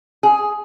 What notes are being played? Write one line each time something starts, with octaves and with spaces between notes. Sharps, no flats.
G#4